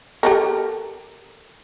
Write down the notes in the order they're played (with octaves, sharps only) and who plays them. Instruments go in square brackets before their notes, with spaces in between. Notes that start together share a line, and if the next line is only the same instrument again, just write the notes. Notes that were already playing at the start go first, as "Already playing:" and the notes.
[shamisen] G4 A4 A#4